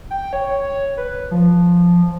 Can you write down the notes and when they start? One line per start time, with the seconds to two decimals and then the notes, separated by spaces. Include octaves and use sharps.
0.10 G5
0.33 C#5
0.97 B4
1.31 F3